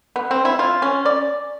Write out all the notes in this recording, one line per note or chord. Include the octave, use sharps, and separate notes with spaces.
B3
C4
E4
F4
C#4
D5